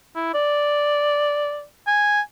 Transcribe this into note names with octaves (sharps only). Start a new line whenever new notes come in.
E4
D5
G#5